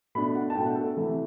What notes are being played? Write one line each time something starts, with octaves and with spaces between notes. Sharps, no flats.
B2 A3 D4 B5
F#5
A5
B2 A3 D4 G5
F#5
A4
A4
C3 E3 A3